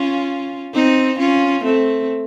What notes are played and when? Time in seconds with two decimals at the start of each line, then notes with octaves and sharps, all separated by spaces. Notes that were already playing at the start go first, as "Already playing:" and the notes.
Already playing: C#4 F4
0.73 C4 D#4
1.18 C#4 F4
1.64 A3 C4